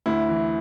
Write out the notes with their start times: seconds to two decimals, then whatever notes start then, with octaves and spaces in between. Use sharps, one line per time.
0.06 D2 E4
0.29 E3